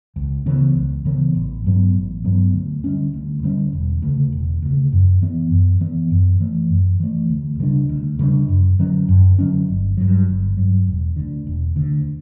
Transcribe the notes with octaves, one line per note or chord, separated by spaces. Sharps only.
C#2
C#3 E3 B3
C#2
C#3 E3 B3
A1
G2 F#3 B3
A1
G2 F#3 B3
D2
D3 G3 C#4
D2
D3 G3 C#4
E1
D2 C#3
E1
D2 C#3
F#2
E3 B3
F#2
E3 B3
F#2
E3 A3
F#2
E3 A3
D2
C#3 G3 D4
D2
C#3 G3 D4
F#2
D3 F#3 C#4
F#2
D3 F#3 C#4
G1
G2 F#3
G1
G2 F#3
E1
D2 D3
E1
D2 D3